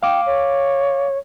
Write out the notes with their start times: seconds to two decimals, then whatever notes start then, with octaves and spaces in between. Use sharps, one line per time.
0.03 F5 G5 D6
0.26 C#5